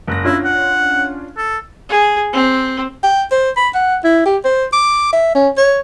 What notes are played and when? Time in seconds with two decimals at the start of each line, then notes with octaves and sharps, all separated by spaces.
0.07 F#1 F#6 A#6
0.24 C#4 D4 E4 F4
0.44 F#5
1.37 A4
1.89 G#4
2.33 C4
3.03 G5
3.31 C5
3.57 B5
3.75 F#5
4.04 E4
4.26 G4
4.44 C5
4.73 D6
5.13 E5
5.35 C#4
5.57 C#5